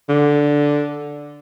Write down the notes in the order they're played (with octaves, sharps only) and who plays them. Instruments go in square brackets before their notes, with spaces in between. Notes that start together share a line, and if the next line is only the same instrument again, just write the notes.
[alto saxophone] D3